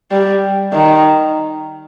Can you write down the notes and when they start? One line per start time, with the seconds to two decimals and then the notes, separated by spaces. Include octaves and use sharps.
0.11 G3
0.73 D#3